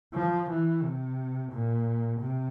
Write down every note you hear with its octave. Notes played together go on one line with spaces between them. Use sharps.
F3
E3
C3
A#2
C3